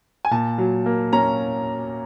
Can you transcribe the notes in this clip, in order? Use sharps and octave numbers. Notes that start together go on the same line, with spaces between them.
G#5
A#2 A5
F#3
A#3
C#4 A#5